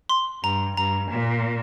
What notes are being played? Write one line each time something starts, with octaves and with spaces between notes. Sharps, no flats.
C6
G2 A#5
G2 A#5
A#2